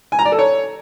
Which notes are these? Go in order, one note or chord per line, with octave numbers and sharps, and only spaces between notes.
G#5
A#5
D5
A4
C#5